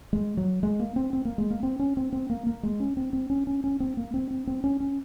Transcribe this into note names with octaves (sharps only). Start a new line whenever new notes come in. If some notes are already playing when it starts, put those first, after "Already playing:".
G#3
F#3
G#3
A#3
C4
C4
A#3
G#3
A#3
C4
C#4
C4
C4
A#3
A#3
G#3
C#4
C4
C4
C#4
C#4
C#4
C4
A#3
C4
C4
C4
C#4
C#4